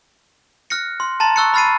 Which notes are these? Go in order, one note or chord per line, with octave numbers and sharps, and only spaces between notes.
F6 F#6 A#6 C#7
C6
A5 A#5 C6 A6
C#6 E6 F#6 A6 C#7
B5 F6 A6 C7 D#7